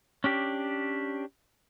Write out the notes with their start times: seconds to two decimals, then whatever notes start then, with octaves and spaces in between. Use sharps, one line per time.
0.24 C#4 D4 G4